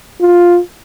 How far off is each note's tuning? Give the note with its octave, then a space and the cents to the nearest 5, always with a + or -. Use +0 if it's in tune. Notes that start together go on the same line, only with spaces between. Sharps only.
F4 +5